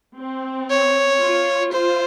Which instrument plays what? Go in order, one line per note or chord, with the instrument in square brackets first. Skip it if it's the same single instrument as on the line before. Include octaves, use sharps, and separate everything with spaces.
[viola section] C4
[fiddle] C#5
[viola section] F4
[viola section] F4 [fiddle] C5